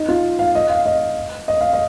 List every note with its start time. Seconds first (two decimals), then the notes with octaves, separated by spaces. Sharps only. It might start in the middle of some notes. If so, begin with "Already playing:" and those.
Already playing: D#4
0.09 F4
0.39 F5
0.55 D#5
0.70 F5
0.86 D#5
1.48 D#5
1.61 F5
1.73 D#5